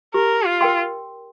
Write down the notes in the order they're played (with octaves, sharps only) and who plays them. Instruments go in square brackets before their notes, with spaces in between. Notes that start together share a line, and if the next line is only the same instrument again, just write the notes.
[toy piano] G4 [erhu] A#4
[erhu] F4
[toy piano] A#4 G5 C6